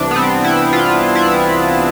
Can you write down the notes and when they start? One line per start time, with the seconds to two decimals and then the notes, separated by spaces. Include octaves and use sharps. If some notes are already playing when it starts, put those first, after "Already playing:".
Already playing: C2 C3 E3 D4
0.11 B3
0.16 C4
0.44 E4
0.73 F4
1.15 E4